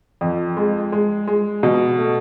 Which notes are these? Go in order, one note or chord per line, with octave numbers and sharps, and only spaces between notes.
F2
G#3
G#3
G#3
B2
A3